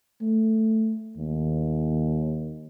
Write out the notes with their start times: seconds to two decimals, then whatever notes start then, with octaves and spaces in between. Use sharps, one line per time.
0.21 A3
1.17 D#2